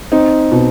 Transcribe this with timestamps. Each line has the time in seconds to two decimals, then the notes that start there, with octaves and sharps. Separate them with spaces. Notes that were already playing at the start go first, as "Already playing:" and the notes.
0.12 C4 D#4
0.52 B2